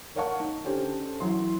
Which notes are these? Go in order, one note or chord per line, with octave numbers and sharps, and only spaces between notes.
A#4 C#5 F5 F#5 A5 C#6
D#4
D3 C#4 G4 C5
E3 F#3 C6